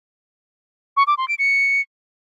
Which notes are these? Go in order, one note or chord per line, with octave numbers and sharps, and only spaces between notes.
C#6
D6
C6
D7
C#7